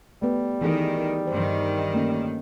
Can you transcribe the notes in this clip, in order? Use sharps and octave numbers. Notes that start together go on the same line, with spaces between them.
G3 A3 B3
D#3 E3 G#4 A4
G2 D#3 C5
A3 A#3 C#4